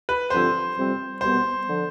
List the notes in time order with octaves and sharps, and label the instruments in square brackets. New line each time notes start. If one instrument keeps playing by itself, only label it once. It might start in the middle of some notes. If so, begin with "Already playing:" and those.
[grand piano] B4
[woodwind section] G2 D3 F3 C4 F4 [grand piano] C5
[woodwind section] F2 C3 G3 C4
[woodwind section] C2 B2 G3 B3 [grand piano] C5
[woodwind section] D3 F3